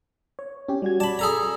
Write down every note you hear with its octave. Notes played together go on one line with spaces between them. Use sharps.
C#5
C#4 G4
G3 F#4 G#6
D5 A5 B5
G#4 A4 A#5